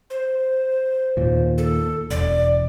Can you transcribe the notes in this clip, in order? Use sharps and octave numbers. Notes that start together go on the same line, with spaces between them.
C5
D#2 A#2
A4
E1 D5